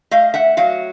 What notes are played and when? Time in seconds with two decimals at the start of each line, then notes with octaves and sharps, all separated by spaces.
0.11 A3 D#5 F5
0.34 E5 F#5
0.57 F#3 D#5 F5